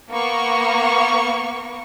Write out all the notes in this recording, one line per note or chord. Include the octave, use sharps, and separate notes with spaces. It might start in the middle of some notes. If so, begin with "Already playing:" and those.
A#3 B3 C#6